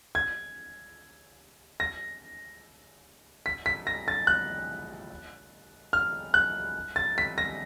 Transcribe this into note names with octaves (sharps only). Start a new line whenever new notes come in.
G#6
A#6
B6
B6
A#6
A6
F#6
F6
F#6
A6
B6
A#6